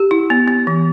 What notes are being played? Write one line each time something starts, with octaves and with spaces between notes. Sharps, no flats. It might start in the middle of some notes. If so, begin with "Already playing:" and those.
Already playing: G4
E4
B3
B3
E3